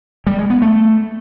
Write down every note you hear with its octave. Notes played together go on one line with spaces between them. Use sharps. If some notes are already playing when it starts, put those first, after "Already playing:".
G3
G#3
B3
A3